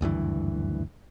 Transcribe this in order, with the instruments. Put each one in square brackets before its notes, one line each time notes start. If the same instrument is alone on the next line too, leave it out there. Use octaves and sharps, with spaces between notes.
[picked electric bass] F#1 D2 G2 E3